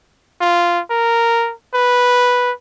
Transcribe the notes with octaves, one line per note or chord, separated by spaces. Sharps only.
F4
A#4
B4